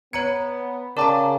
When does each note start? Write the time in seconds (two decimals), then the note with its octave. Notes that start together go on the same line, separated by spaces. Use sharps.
0.13 B3 C#5 A#5 G#6 C#7
0.97 C#3 A#4 D5 G5 A5 A#5 D6